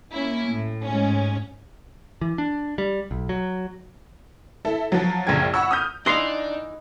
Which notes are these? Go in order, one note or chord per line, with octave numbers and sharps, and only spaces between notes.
A#3 C#4 E4
A2
G#2 C#4
E3
D4
G3
B1
F#3
E4 A4
F3 F#3
A#1 F#2 C#3 G5 G#6
F#5 B5 C#6 E6
D#6 F6 G6
E3 D4 D#4 D#5 F5 C6